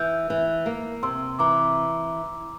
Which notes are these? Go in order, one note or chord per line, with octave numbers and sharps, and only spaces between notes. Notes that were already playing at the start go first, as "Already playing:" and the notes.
Already playing: E3 E6 G6
E3
A#3
C3 C6 E6
E3 A#5 D6